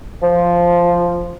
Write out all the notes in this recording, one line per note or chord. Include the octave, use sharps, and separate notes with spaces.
F3